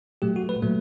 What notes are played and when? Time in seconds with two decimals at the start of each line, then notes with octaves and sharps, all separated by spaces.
0.22 A#2 F#3 A3 G4
0.36 F#4
0.49 B4
0.62 A#2 F#3 A3